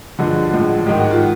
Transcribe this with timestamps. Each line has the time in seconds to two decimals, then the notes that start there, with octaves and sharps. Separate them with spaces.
0.19 G2 D3 F3 G#3 F#4
0.53 A2 F3 G#3
0.86 G#2 D#3 G#3 G4
0.99 F#4
1.11 F4